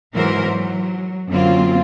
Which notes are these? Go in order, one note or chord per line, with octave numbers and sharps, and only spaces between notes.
G#2 E3 F#3 A#4 C5
F#3
F#2 D3 A#3 C4 F4